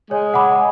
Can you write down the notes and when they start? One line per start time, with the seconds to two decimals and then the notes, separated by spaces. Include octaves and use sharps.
0.10 G#3 G#4 C#5
0.34 F#5 B5 D6